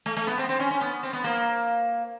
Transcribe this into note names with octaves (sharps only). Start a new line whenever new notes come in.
A3
A3
B3
C4
C4
C#4
C#4
B3
C4
B3
A#3